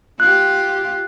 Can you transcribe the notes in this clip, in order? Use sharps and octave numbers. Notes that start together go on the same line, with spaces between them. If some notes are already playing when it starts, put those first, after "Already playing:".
F4 G4 F#6